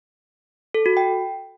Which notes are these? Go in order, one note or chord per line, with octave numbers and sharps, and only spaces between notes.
A4
F#4
G5